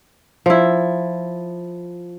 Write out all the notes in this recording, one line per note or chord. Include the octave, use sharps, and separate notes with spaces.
F3 E4